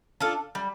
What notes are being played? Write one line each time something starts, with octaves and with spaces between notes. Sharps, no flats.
D4 F4 A4
G3